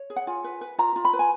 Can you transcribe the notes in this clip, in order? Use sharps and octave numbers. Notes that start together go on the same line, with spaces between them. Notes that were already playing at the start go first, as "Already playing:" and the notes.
Already playing: C#5
G#4
F#5
F4 G#5
B4
B4
F4 A#5
F4
B5
B4
G#5